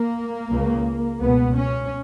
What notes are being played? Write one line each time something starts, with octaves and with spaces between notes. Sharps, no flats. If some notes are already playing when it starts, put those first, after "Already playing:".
Already playing: A#3
C#2 C#3
C#2 B2 B3
C#4